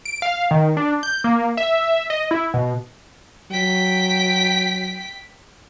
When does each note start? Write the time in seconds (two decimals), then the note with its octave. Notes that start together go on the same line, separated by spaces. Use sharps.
0.05 D7
0.22 F5
0.51 D#3
0.77 D4
1.03 G6
1.24 A#3
1.57 E5
2.10 D#5
2.31 E4
2.54 B2
3.51 F#3 G5 B6